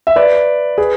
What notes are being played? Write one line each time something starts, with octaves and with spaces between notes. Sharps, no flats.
E5
B4 D5
G#4 B4